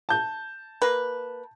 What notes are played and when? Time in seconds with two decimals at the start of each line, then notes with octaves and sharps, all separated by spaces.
0.09 A5 G6
0.82 A#3 B4